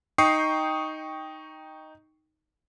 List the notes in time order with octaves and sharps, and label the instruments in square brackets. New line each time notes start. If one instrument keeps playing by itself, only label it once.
[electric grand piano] D#4 G5 C#6 D#6 C7 C#7